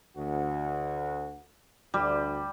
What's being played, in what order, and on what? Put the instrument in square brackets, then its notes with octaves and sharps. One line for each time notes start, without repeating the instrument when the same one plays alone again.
[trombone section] D2 F#4
[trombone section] D2 [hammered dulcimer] G3